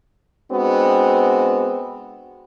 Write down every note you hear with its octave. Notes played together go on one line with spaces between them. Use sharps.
G#3 B3 C4 D4 F#4